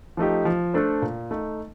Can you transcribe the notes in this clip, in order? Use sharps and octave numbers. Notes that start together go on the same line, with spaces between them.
F3 A3 D#4 G4
F3
A3 D4 A4 C5
A#2
A3 D#4